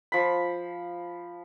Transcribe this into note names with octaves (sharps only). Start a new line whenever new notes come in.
F3 B5